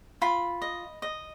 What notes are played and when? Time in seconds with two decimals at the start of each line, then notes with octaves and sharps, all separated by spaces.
0.22 F4 B5
0.62 D#5
1.02 D#5